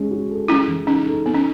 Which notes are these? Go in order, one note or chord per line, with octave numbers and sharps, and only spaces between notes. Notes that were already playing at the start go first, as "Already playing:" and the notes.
Already playing: G#3 C#4
F#4
A4
G#3 C#4 E4
E3
C#4 D#4
A4
B3 D#4
C#4